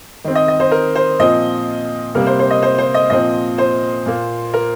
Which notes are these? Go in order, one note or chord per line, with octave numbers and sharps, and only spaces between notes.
D#3 C4
D#5
D#5
C5
A#4
C5
A#2 F3 C4 D#5
C3 G3 A#3 A#4
C5
C5
D#5
C5
C5
D#5
A#2 F3 C4 D#5
C5
A#2 A#3
A#4